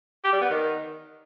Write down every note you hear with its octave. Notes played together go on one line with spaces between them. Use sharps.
G4
G3
B3
D#3